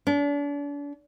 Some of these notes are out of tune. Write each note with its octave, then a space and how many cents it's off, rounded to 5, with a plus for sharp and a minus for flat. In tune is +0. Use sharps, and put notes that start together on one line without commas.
D4 -40